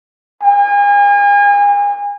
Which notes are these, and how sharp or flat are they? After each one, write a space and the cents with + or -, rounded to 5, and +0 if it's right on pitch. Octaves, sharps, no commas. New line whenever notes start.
G#5 -35